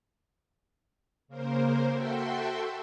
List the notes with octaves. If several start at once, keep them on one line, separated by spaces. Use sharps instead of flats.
C#3 A#3 A#4 C5
F#4 A4 E5 G5 C6